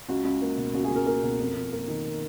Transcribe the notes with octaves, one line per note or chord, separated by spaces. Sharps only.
C#2 F#4
C#2
A#3
B2
C#2 F#4
G#4
C#2 A#4
A#3 A#4
B2
F2
F2
A#3 A#4
D#3